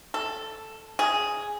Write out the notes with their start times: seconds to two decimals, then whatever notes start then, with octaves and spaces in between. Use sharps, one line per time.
0.14 A4
0.99 G#4